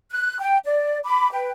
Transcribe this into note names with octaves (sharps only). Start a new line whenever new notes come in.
F#6
G5
D5
B5 D6
B4 G5